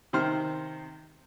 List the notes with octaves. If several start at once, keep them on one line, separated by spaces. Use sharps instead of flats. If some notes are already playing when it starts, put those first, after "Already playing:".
C3 D#3 C4 C5 F6